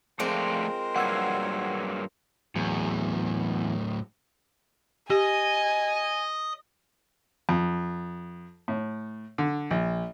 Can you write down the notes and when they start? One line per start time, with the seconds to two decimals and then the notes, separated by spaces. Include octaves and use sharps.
0.20 F3 G#3 A3 C4 F4 A#4 C5 D5
0.96 G2 F#3 A#3 F#5 E6 G#6
2.55 E2 A2 F#3
5.10 G4 D#5 G#5
7.49 F2
8.68 A2
9.38 D3
9.71 A#1